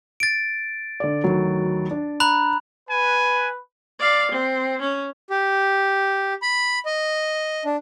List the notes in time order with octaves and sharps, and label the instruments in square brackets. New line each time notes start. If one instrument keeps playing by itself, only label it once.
[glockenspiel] A6 D7
[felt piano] D3 D5
D2 D#3 F#3
D4
[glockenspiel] A#5 B5 F#6
[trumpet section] B4 [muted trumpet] G#5
[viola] D5 F5
C4
C#4
[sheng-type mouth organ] G4
B5
D#5
D4